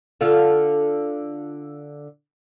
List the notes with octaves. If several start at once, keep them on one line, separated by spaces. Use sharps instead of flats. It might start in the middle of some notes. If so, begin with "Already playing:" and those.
D3 F4 A4